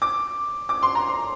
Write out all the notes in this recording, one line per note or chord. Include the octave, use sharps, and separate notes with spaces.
D6
D6
C6
A#5
C6